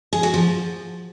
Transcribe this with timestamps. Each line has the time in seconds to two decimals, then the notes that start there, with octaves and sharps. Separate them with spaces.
0.13 G#4
0.23 F#4
0.34 F3